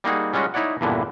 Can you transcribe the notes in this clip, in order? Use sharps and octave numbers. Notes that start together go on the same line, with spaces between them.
G3 A#3 D#4 F#4 G#4
G3 G#3 C#4 F4 F#4
D#4 E4 C#5 D5 F#5
E2 G2 A#2 D3 E3